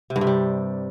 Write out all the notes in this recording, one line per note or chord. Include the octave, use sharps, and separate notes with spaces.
C3
G2
C3
G3